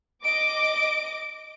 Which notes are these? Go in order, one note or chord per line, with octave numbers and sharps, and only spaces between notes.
D#5 D6 D7